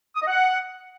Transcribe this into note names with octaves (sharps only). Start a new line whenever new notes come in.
D#6
D#5
F#5